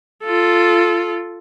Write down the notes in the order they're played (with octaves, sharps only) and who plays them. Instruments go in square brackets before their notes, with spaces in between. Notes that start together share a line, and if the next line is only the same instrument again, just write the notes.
[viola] F4 A4